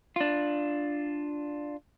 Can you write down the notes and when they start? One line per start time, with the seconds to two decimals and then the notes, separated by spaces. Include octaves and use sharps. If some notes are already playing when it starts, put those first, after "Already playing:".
0.16 D4 F4